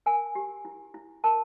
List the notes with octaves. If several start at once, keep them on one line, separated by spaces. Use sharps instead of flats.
A#4 G#5
G4
E4
E4
A#4 A5